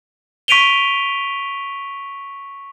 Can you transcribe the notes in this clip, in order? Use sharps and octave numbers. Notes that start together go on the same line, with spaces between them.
C#6 B6 D7 D#7 F7 G7